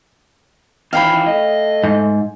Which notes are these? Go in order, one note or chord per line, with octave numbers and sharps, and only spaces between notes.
D#3 E3 C#4 E4 F4 F5 G5 B5
A3 D#5
G#2